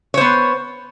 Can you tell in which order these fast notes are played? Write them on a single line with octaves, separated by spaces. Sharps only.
C#5 C5 B3